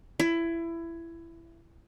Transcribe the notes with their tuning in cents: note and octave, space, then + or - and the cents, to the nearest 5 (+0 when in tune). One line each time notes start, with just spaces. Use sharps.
E4 +20